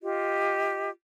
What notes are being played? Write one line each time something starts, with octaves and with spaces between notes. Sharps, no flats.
F4 G4 D#5